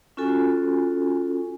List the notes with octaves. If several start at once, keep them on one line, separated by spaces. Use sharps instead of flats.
C#4 F4 F#4 A4 G#5